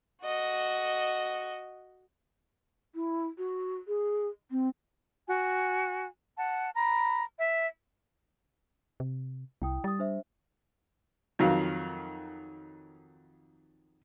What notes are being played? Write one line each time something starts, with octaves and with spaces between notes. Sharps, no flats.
F#4 D#5
E4
F#4
G#4
C4
F#4 G#5
F#5 A5
A#5 B5
E5
C3
C2 E4 G5 D#6
G3 D#6 A6
D4 C5 E5
F2 D#3 F#3 F5